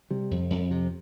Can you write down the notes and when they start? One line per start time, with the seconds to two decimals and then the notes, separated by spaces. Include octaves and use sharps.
0.11 C3 G3
0.31 F2
0.50 F2
0.71 C3